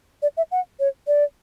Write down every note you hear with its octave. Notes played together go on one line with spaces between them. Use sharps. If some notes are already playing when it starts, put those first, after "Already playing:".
D5
E5
F#5
C#5
D5